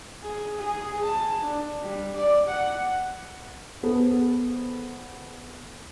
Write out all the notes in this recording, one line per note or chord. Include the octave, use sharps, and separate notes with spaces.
G#4
G#4
A5
D4
G3
D5
F#5
B3 G#4 A4 C5